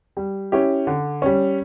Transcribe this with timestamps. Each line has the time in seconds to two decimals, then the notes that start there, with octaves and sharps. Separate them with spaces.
0.17 G3
0.52 C#4 E4 G4
0.87 D3
1.22 G3 C#4